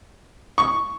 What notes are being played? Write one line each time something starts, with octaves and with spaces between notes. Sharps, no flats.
C#6